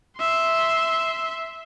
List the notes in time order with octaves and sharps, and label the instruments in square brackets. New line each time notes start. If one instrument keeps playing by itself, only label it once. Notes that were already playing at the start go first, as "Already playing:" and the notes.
[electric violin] E5 C6